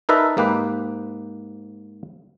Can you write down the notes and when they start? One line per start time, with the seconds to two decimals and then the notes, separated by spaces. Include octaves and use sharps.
0.09 D#4 A#4 B4 D5 E5 A5
0.37 G#2 A#3 G4 B4